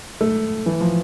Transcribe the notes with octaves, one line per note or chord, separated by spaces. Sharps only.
A3
E3
F3